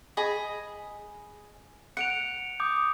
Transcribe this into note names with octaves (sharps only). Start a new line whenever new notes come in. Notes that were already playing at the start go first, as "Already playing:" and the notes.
G#4 D#5 B5
F#5 C#7 D7 F7
D6 D#6 G6